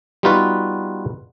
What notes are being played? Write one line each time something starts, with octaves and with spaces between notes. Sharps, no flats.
G3 B3 D#4 F4 F#4 B4